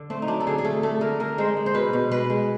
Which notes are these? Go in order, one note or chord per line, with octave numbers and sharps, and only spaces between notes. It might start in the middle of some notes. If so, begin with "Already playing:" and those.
Already playing: D3
A3 C4
D#4
F#3 D4
A4
D3 G#4
G#4
A3 A4
A3 A4
D3 A#4
D3 A#4
G#3 C5
G#3
C5
B2 B4
B2
G#3 B4
G#3